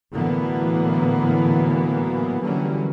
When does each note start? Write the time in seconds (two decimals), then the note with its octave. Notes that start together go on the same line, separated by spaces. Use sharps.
0.13 A2 D3 E3 F#3 A#3 B3
2.41 D3 E3 F#3 G3 A#3 C#4